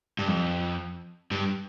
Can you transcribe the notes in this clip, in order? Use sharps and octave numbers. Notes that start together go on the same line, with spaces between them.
G2
F2
G2